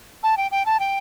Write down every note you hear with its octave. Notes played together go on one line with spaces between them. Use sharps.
A5
G5
G5
A5
G5